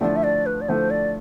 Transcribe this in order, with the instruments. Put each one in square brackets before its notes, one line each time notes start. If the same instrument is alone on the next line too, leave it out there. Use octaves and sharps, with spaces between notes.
[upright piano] D3 F3 A3 E4 [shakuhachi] D5
[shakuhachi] E5
D5
B4
D5
[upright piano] D3 F3 A3 E4 [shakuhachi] C5
[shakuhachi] D5